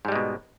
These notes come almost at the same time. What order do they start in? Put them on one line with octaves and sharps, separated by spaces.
G#2 G3 G#3 B2